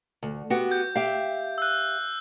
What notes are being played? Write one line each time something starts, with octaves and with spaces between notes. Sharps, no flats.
D2
B3 F#4 G4
G6
G4 E5 F5
E6 F#6